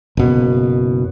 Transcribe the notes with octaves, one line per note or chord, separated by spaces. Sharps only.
F#1 B2